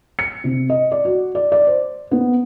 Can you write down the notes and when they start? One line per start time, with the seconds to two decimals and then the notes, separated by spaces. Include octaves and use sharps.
0.19 C#7
0.44 C3
0.70 D#5
0.92 D5
1.05 F#4
1.35 D5
1.52 D5
1.67 C5
2.11 B3